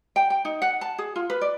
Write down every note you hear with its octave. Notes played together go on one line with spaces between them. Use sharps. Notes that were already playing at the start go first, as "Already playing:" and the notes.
G5
G5
D#4
F#5
A5
G#4
F4
B4
D5